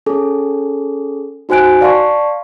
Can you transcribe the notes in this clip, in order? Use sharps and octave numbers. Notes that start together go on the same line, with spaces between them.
C#4 G#4 A4
D#4 F#4 C5 G#5 F#6 D7
D5 F5 A5 C6 C#6